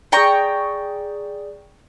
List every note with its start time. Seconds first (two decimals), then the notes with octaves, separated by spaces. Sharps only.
0.12 G#4 D5 G5 A#5 C#6